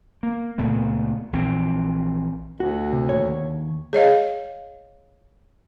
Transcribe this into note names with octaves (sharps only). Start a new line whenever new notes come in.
A#3
C#2 A#2 A3 B3
A#1 E3 C4
D2 F#4
C3
D#2 A#2 C#5
G#4 C#5 D#5 F5